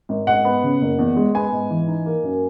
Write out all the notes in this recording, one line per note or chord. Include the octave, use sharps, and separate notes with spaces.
G#1
G#2 F#5
B3
C#3
F#1
E2
G#3
B3 G#5
G#2
E3
D#4
A#3
F#2